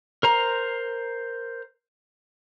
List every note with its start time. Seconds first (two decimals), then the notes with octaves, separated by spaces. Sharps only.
0.23 A#4 C5 A#5